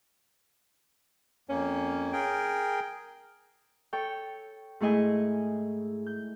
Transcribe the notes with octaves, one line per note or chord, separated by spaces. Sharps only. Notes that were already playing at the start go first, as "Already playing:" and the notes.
F2 A#3 C#4
G#4 A#4 G5
A4 C#5 G5
G#2 A3 E4 G#4 D#5 G#5
G6